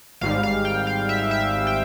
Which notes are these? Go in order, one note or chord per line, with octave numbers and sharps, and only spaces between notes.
G#1 G#2 G3 F5
F5
G5
F5
E5
E5
G5